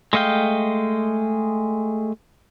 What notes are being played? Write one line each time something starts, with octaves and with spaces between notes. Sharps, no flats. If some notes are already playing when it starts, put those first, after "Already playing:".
G#3 A3 D#5 F5 G5